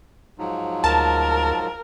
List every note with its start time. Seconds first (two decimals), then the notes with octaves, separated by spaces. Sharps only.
0.38 G#2 F3 F#3
0.84 D2 A#4 A5